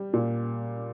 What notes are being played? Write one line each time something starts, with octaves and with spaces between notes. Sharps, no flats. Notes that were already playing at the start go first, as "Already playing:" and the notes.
Already playing: G3
A#2